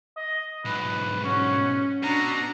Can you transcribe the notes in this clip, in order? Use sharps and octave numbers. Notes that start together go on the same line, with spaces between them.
D#5
B1 G#2 B4
C#4 F#4
B2 F#3 D4 A#5